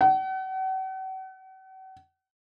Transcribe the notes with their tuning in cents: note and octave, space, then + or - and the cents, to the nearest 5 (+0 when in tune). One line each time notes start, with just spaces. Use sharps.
F#5 +40